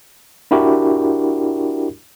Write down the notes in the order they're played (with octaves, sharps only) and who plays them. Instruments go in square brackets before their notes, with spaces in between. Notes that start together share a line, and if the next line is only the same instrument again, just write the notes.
[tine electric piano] D4 E4 F#4 G4 A#4